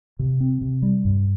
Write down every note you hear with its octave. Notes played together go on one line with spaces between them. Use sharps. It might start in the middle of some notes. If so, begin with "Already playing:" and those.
C3
C4
C3
G3
G2